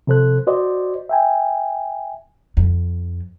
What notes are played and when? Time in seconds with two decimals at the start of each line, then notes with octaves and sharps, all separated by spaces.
0.07 C3 F3 A4 C5 F#6
0.47 F#4 C5 D5 D#5
1.09 E5 G5 G#5
2.57 F2